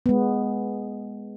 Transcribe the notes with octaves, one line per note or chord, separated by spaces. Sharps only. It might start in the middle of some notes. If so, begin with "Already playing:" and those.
G#3 B3